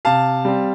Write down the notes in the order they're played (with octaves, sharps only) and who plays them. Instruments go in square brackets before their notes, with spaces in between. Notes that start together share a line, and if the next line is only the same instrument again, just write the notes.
[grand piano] C3 F5 A5
G3 C4